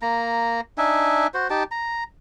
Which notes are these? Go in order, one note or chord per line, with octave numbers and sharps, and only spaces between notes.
A#3 A#5
D4 D#4 E5 G#5
F#4 C5
D#4 G4 A5
A#5